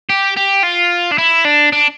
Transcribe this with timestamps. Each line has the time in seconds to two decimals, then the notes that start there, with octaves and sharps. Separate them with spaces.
0.10 G4
0.37 G4
0.63 F4
1.12 D4
1.18 E4
1.45 D4
1.72 D4